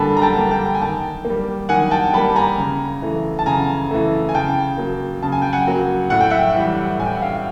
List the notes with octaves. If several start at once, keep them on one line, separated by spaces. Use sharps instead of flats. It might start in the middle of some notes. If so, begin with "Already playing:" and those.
Already playing: D3 G3 A#3 G#5 A5 B5
A#5
G5 A5
G3 A#3
G5 A5
G#5
D#3 G5 A5
A#3
G3
D#3 F#5 G#5
G5 A5
G3 A#3 A5 B5
G#5 A#5
C#3
E3 A3
A5
C#3 G#5 A#5
E3 A3
G#5
C#3 G5 A5
F#3 A#3
C#3 A5
G#5
G5
F#5 G#5
F#3 A#3
A2 F#5
G5
E5 F#5
E3 G3
A2 G#5
G5
F#5
F5 G5